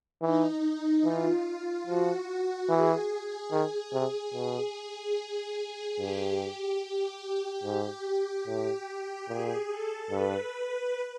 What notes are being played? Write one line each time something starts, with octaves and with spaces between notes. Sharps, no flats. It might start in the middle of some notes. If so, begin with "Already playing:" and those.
E3 D#4
E3 F4
F3 F#4
E3 G#4
D#3
C3
B2
G2 G4
G4
G#2
A2 G4
A#2 G#4
A4
G2 B4